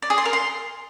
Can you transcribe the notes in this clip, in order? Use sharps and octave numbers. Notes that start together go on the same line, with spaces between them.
D5
G#4
C6
A#4
C6